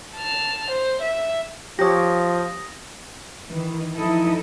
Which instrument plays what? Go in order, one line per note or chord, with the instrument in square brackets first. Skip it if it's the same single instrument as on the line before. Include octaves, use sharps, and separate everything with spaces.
[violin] A5 F6
C5
E5
[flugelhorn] F3 [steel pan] G4 C#5 [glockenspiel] D#6 A#6
[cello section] D#3 E3
E3 F3 D#4 E4 A4 D#5